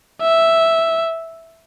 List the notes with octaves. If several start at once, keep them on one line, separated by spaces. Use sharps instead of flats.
E5